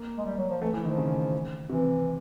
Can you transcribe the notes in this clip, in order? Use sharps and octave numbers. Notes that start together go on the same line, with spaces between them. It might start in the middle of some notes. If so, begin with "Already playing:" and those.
Already playing: A#3
G#3
G3
F#3
F3
E3 A3
E3
D#3 F3
C#3
C3 E3